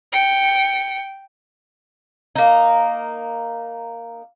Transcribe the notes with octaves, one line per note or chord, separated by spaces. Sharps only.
G5 C#7
A#3 D#4